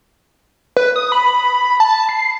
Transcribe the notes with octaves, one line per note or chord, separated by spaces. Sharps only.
B4
D#6
B5
A5
C7